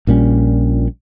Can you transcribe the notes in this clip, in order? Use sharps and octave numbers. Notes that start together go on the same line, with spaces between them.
A#1 A#2 G3 C#4